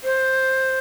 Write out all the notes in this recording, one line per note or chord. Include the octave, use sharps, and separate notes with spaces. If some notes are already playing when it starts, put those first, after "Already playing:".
C5